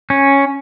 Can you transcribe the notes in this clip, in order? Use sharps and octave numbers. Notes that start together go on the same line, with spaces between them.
C#4